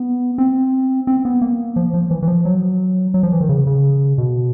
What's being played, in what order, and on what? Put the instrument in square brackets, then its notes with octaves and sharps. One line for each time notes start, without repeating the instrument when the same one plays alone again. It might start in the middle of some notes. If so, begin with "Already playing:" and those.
Already playing: [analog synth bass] B3
C4
C4
B3
A#3
F3
F3
E3
E3
F3
F#3
F#3
F3
E3
D#3
C#3
C#3
B2